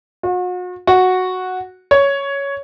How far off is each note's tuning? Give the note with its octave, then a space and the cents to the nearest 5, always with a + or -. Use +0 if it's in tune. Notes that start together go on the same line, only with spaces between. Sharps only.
F#4 -40
F#4 -5
C#5 +10